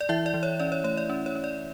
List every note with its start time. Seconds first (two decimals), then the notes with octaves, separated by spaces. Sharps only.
0.01 D5
0.09 E3 E4 E5
0.26 D5
0.34 E3
0.43 C#5
0.60 C#4 D5
0.72 C#5
0.84 A3 C#5
0.97 D5
1.09 C#4
1.26 C#5
1.35 C#4
1.44 D5